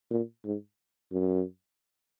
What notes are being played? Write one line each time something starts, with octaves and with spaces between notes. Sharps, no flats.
A#2
G#2
F#2